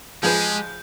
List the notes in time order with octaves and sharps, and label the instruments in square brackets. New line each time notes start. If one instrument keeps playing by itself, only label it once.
[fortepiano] F3 G#4 B4 [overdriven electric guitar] G#3 [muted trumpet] G4 [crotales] G6